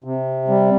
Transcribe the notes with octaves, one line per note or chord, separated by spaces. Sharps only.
C3
G3